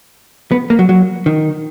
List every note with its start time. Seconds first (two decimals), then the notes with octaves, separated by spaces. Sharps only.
0.52 B3
0.70 A#3
0.79 F#3
0.89 F#3
1.26 D#3